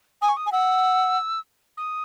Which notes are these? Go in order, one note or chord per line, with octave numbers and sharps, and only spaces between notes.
G#5 D#6
C#6
D#6
G#5
F#5 E6
D#6